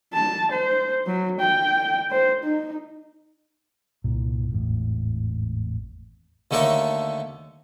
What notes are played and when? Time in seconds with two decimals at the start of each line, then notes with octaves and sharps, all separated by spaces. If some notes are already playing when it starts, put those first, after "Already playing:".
0.13 A5
0.52 C5
1.06 F#3
1.40 G5
2.11 C5
2.44 D#4
4.04 C2 G2 A#2
4.50 G#1 E2 A2
6.51 D#2 D3 A3 A4 A#4 C#5